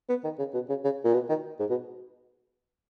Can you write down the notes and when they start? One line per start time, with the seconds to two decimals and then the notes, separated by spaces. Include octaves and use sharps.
0.09 B3
0.24 D#3
0.39 C#3
0.54 B2
0.69 C#3
0.84 C#3
1.04 A#2
1.14 B2
1.29 D#3
1.60 G#2
1.70 B2